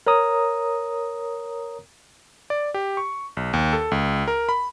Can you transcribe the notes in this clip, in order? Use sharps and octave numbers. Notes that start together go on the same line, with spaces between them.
A#4 C#5 A#5 D#6
D5
G4
C#6
B1
D#2
A4
C#2
A#4
B5